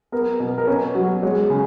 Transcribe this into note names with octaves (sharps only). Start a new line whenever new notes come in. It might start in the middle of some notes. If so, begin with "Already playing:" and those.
B3 A#4
B2
A#4
C#4 B4
F#3
G#3 C#5
C#3